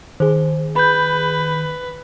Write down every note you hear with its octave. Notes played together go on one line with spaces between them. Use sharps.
D#3 G#4 C5
B4 B5 G6